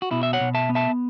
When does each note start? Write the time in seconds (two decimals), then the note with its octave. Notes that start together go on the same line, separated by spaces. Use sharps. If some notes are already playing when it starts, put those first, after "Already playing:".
0.02 F#4
0.11 B2 E4
0.23 E5
0.33 C#5 F#5
0.41 B2
0.54 E5 A5
0.69 B3
0.75 E5 A5